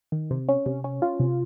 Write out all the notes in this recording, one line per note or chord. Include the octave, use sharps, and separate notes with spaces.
D#3
C3
C#4
C3
C#4
F4
C3